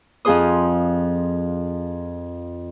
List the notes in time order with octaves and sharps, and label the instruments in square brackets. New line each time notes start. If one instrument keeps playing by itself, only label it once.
[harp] F2 F3 F4 G#4 C5 D#6